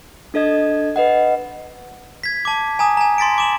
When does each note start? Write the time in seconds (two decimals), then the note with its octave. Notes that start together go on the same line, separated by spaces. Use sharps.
0.34 D4 A4 D#5 G#6
0.96 B4 D#5 F#5
2.23 G#6 B6
2.45 A5 D6
2.79 G#5 A#5 D#6
2.97 G#5 A#5
3.18 C6 A6 B6 D7
3.38 D6 E7 F#7